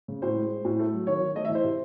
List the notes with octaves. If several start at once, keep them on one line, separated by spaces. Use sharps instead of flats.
C#3
A2 C5
G#3
G#3
A2
A3
F#3
D#3 C#5
D#3
A3 D#5
E5
E3
C5
C3